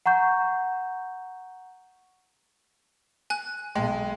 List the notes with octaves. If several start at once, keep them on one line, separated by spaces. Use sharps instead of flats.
F#5 A#5 C#6 G6
G#5 F#6
B1 G#3 G5 A5